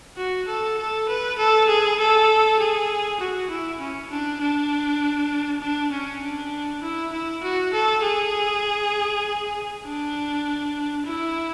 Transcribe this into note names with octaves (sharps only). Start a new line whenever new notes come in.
F#4
A4
A4
B4
A4
G#4
A4
G#4
F#4
E4
C#4
D4
D4
D4
C#4
D4
E4
E4
F#4
A4
G#4
D4
E4